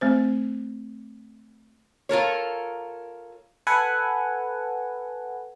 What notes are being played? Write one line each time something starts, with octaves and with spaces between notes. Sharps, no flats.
A3 C4 C5
F4 A4 A#4 C#5
A4 B4 F#5 G#5